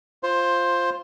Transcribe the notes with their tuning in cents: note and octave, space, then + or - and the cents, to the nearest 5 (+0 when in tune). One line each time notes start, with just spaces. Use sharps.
F4 -5 C5 +10